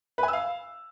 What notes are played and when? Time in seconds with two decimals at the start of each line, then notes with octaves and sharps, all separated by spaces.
0.18 B4
0.23 G#5
0.28 E6
0.33 F5